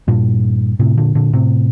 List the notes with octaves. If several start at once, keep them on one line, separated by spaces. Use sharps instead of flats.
G2 A#2
A2 C3
A#2 D3
A#2 D3
A2 C3